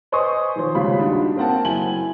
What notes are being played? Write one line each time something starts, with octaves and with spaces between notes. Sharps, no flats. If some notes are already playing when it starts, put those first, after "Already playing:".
B4 C5 D#5 G#5 C#6 D#6
D#3 F3 C5
D#1 G#1 C#3 F4 B5
D4 D#4 F4 F#4
A#3 C4 A#4 F#5 G5 A5
F#1 E4 G#5 F#7